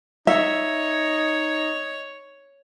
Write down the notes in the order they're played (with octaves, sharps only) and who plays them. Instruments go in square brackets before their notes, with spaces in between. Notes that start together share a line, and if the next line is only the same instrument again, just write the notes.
[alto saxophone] D#4 [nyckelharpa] C#5 [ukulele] E5